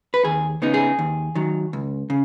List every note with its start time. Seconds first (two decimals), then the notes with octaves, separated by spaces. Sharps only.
0.14 B4
0.25 D#2 G#4
0.62 C#3 B3 D#4
0.74 G#4
0.99 D#2
1.35 D#3 F#3
1.73 C#2
2.10 C#3